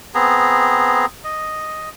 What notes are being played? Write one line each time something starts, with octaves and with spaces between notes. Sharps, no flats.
B3 C4 G#4 A#5
D#5